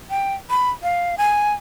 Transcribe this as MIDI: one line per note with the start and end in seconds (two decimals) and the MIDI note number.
0.10 0.34 79
0.50 0.70 83
0.83 1.16 77
1.18 1.53 80